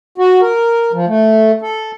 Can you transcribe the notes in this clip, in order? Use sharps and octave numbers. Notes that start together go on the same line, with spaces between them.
F#4
A#4
F3
A3
A4